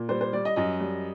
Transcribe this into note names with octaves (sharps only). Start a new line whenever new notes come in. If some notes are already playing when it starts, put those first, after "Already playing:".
Already playing: A#2
G3 C5
C5
G3 D5
D#5
F#2 D#5
G3